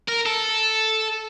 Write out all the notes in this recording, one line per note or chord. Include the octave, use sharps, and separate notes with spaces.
A#4
A4